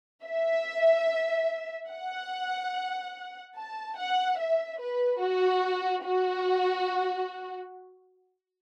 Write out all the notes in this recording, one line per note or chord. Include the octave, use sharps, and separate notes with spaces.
E5
F#5
A5
F#5
E5
B4
F#4
F#4